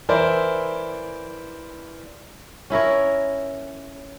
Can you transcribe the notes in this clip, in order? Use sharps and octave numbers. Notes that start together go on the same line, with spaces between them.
E3 E4 A#4 C5 D5
C#4 E4 A#4 C#5